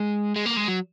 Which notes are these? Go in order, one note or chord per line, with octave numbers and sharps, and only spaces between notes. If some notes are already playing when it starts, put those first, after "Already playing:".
Already playing: G#3
G#3
A#3
G#3
F#3